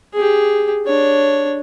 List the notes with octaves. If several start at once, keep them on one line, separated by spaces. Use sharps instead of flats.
G4 G#4
D4 C#5